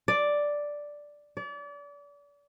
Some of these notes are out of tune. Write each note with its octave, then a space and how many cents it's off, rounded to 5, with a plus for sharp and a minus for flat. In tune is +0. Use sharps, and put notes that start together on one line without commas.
D5 +0
D5 -35